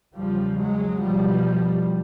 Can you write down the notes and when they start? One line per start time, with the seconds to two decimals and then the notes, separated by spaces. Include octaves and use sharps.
0.15 E2 C#3 F3 G3
0.58 F#3 G#3
1.01 E2 B2 F3 G3